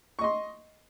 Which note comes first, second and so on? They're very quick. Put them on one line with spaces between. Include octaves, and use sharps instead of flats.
C#6 D#5 C6